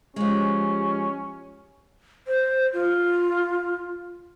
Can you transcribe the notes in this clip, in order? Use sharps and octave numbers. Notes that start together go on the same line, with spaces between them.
F3 G#3 C#4 G4
C5
F4